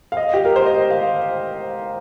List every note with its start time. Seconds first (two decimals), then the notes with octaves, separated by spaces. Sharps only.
0.12 F5
0.17 D#5
0.34 G4
0.45 A#4
0.56 C5
0.66 D#5
0.91 F5